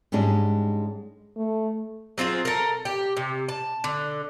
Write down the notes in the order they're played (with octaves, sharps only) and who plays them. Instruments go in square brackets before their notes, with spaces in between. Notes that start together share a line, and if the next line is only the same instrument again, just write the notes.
[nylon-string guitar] G#2 G3 G#3 C#4 D4 G#4
[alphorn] A3
[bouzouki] F#3 C4 F4 G#4
A4 A#4
G4
C3
A5
D3